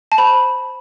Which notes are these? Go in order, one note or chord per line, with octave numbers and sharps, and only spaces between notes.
A5
C5 B5